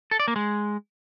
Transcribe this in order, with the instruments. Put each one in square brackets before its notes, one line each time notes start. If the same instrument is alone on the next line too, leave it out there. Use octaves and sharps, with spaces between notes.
[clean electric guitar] A4
D5
A#3
G#3